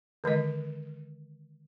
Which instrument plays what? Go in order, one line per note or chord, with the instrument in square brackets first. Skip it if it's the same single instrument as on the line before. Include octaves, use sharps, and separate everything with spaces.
[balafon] D3 D#3 G#3 D#5